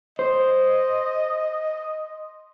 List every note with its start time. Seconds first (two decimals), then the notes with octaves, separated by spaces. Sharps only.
0.19 C5 D#5